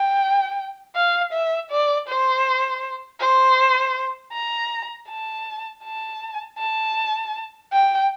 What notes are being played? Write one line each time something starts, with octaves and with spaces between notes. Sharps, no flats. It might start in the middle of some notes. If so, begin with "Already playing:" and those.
Already playing: G5
F5
E5
D5
C5
C5
A#5
A5
A5
A5
G5